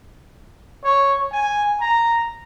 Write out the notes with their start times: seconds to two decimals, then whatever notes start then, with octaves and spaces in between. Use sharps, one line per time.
0.84 C#5
1.32 G#5
1.81 A#5